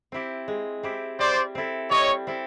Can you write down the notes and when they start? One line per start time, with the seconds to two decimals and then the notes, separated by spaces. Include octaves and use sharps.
0.12 C4 E4 G4
0.48 G#3
0.83 C4 E4 G4
1.19 G3 C5 D5
1.55 C4 E4 A4
1.90 G3 C#5 D#5
2.27 C4 E4 A4